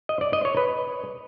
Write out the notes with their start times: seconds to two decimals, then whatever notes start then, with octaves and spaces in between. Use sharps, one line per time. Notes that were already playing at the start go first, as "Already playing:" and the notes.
0.09 D#5
0.21 D5
0.33 D#5
0.45 C#5
0.57 B4